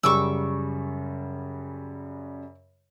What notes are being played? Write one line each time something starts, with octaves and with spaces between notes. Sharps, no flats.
F#2 C#3 G3 C#6 D6 E6